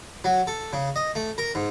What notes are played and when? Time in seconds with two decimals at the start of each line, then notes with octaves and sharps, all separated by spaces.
0.24 F#3
0.47 A4
0.73 C#3
0.96 D#5
1.15 A3
1.38 A#4
1.55 G#2